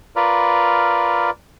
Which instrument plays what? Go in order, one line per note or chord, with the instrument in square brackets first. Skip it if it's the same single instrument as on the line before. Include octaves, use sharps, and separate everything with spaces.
[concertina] F4 A#4 B4 D5